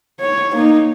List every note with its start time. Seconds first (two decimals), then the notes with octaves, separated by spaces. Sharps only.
0.20 C#5
0.53 A#3 D#4